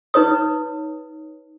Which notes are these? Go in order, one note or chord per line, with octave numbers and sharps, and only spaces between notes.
D#4 B4 C#5 D#6